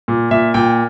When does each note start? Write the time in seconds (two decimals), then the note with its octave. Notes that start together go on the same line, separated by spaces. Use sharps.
0.08 A#2
0.31 A#2 E5
0.54 A#2 G5